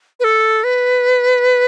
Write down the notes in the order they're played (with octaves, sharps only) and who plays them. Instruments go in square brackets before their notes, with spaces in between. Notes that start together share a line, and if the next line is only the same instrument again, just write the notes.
[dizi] B4
A4
B4